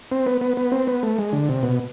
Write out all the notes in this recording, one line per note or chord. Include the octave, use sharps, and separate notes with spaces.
C4
B3
B3
B3
C4
B3
A3
G#3
D3
C3
B2